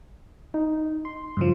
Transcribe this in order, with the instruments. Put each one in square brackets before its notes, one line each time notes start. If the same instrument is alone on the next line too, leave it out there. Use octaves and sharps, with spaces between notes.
[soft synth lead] D#4
C6
[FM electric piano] G2 C#3 F3